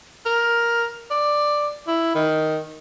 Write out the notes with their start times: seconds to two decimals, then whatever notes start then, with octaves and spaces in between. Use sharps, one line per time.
0.25 A#4
1.11 D5
1.87 E4
2.15 D#3